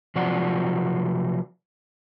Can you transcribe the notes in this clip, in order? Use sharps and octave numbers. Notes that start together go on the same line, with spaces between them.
C3 F3 F#3 F4 D5 F#5